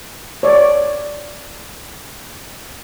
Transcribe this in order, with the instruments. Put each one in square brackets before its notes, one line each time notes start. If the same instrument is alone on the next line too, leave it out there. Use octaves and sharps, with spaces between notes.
[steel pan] C#5 D5